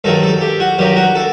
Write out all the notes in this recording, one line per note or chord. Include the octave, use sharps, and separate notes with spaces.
G2 D#3 F#3 A4
A4
G4
F#4
G2 D#3 F#3 G4
F#4
A4